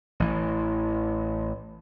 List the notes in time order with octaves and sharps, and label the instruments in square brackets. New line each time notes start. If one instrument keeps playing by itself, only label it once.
[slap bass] A1 E3